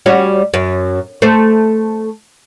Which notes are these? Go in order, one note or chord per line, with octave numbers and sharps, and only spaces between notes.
G3 C#4 F#4
F#2
A3 C5